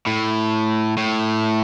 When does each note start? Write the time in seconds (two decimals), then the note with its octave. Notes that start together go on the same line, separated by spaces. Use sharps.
0.06 A2
0.97 A2